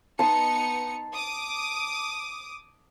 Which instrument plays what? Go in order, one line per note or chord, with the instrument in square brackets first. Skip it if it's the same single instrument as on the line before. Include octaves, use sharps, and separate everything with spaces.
[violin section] B3 D#4 C#7 [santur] A5 C6
[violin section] D6 D#6